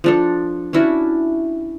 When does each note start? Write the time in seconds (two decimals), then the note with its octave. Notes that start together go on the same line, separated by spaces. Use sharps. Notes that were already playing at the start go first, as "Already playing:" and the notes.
0.04 F3 D4 A4
0.73 C#4 D4 E4 F#4